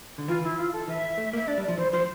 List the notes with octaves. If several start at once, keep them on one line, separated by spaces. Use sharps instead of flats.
D3
E3 F4
E4
F4
A4
E3 E5
A3
A#3
E5
D4 D5
G3
D5
F3
E3 C5
F3 C5